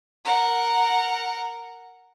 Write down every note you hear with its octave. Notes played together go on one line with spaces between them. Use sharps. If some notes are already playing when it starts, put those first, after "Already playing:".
A#4 F#5